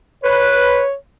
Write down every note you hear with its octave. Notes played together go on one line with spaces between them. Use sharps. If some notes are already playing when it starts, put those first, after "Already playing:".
B4 C#5